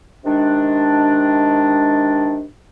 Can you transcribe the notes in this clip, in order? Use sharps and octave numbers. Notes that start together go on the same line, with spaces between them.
C3 D#3 G#3 D4